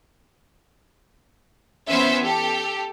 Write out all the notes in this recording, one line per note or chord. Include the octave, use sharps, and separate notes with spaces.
E3 B3 C#4 B4 C5 E5
G4 A4